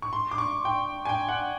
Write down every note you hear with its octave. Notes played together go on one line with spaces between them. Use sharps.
C#6
C6
D6
C#6
G5
G#5
G5
F#5